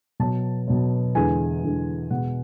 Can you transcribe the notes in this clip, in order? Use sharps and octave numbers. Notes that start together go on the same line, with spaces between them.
B2 F#3 A5
B2 F#3
E2 D3 G#3 G#5
E2 D3 G#3
B2 G#3 F#5